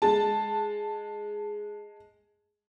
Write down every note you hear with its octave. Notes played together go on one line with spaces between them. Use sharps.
G#3 A5